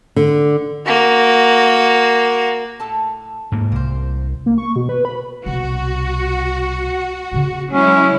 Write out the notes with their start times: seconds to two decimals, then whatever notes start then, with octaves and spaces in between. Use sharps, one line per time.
0.16 D3
0.86 A#3 F#4
2.80 A2 A4 A5
3.52 G#2 A#3
3.72 C2 A#3 C5
4.46 A#3
4.58 C#6
4.76 B2
4.89 B4
5.05 B5
5.46 C2 B2 F#4
7.32 C#3 A#3
7.71 F#3 G#3 C#4 E4